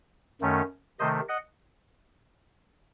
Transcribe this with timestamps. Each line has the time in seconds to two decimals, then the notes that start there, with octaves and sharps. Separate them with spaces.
0.41 F#2 D#3 A3 C#4
0.99 C3 D#3 A3 C5 D#5
1.29 D#5 F#5